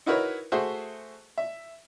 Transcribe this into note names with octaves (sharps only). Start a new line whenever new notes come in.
D#4 E4 F#4 A#4 B4 C#5
A3 F#4 G#4 C5 E5
E5